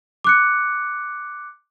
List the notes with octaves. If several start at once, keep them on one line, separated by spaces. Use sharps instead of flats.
D6 F#6 C#7